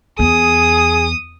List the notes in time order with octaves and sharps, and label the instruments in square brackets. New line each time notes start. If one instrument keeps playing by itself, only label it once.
[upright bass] E2 [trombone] G#4 [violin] D#6